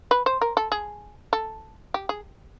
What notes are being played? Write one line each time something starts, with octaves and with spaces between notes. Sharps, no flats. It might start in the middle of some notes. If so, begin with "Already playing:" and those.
B4
C5
A#4
A4
G#4
A4
G4
G#4